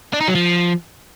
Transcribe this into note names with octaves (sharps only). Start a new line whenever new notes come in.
D4
D#4
F#3
F3